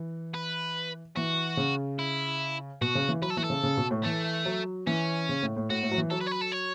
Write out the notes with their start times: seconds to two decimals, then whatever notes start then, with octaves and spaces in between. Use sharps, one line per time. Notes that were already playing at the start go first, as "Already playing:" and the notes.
Already playing: E3
0.34 B4
1.17 E3 F#4
1.57 C#3
1.99 E4
2.81 B2 F#4
2.95 C#3
3.09 E3
3.22 F#3 B4
3.30 A4
3.37 E3 F#4
3.44 A4
3.50 C#3
3.63 C#3
3.77 B2
3.91 A2
4.05 E3 A3
4.46 F#3
4.87 E3 C#4
5.29 C#3
5.43 A2
5.56 A2
5.70 A2 F#4
5.83 A2
5.91 F#3
5.98 E3
6.11 F#3 A4
6.21 B4
6.27 C#5
6.32 B4
6.42 A4
6.52 C#5